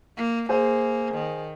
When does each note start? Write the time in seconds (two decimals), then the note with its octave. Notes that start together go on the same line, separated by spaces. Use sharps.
0.17 A#3
0.49 A#3 G#4 C5
1.15 D#3